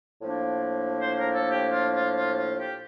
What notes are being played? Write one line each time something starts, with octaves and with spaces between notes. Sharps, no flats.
A2 F3 A#3 D4
C5
A#4
A4
G4
F4
F4
F4
F4
G4